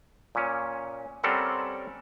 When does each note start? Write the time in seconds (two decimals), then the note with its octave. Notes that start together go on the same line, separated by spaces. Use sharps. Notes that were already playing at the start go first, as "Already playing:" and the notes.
0.35 A#2 C#4
1.23 G3 C4 C#4 A4 A#4 F#5